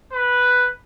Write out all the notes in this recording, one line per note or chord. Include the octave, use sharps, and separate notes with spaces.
B4